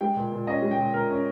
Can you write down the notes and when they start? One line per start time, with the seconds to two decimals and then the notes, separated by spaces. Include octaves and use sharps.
0.01 G#3 G5
0.16 A#2
0.32 A#2
0.47 C#4 D#5
0.62 G#3
0.71 G5
0.79 A#2
0.94 A#2 A#4
1.10 C#4